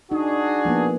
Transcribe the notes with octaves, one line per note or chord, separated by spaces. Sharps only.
D4 D#4 F#4 G#4
F3 A#3 B3